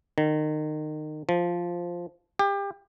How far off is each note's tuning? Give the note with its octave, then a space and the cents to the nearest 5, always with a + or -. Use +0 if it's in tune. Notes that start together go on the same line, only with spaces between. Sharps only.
D#3 -25
F3 +0
G4 +30